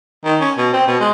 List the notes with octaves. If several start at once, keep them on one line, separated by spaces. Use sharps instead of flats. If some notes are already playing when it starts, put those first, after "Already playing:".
D#3
C#4
B2
C4
B2
G#3